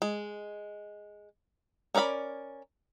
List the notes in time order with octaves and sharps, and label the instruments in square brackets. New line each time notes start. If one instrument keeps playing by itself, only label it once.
[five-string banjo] G#3
C#4 A#4 D5 E5 B5